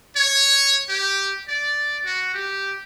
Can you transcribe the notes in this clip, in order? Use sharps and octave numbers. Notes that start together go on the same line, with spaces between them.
C#5
G4
D5
F#4
G4